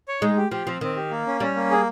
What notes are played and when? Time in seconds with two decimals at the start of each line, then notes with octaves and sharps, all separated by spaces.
0.08 C#5
0.22 G#3 D#4
0.37 G4
0.51 F3 G4
0.66 F3 C4
0.81 D#3 C4
0.96 G4
1.11 A#3
1.26 C#4
1.40 G3 C#4
1.56 A#3
1.71 G#4